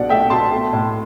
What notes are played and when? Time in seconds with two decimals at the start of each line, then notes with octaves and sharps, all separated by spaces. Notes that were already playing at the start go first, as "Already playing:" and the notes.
Already playing: C2 B2 D4 D5 F#5
0.09 A3 E5 G5
0.30 B2 A5 C6
0.51 A3
0.73 A2